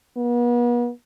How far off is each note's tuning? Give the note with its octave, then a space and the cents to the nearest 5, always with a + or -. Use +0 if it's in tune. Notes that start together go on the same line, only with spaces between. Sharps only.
B3 -40